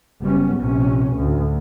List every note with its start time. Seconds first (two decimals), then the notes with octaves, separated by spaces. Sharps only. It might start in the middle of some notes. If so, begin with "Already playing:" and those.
0.21 F#1 G3 B3 C#4
0.59 A#1 C3 C#4
1.16 D2 A2